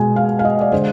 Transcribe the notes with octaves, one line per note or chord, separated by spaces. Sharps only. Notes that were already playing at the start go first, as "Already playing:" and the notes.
Already playing: B2 G#3 G#5
F5
F5
D#5
D5
D3 G#3 C5